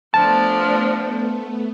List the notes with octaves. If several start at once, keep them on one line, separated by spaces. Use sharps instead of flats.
F3 A3 B3 D4 A5